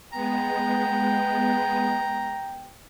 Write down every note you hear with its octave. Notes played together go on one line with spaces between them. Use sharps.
G#3 B3 G5 A#5